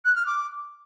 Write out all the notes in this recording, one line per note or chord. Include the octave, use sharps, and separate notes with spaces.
F#6
F6
D6